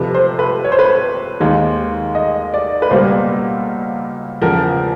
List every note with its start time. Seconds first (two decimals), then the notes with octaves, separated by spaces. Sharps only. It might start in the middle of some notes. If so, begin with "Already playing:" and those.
Already playing: F2 C3 F3 B4
0.14 C5
0.39 B4
0.64 C#5
0.72 C5
0.79 B4
0.85 C5
1.40 D#2 D#3 G#3
2.15 D#5
2.54 D5
2.82 B4
2.90 C#2 B2 G3 A#3 C5
4.41 E2 C#3 F3 A#4